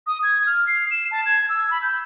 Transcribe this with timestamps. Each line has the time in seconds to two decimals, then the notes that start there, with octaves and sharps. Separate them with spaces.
0.07 D#6
0.23 G#6
0.47 F6
0.67 C7
0.91 E7
1.11 A5
1.26 G#6
1.49 E6
1.71 B5
1.82 G6